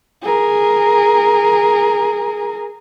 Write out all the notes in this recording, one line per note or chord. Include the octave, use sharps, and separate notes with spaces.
G#4 A#4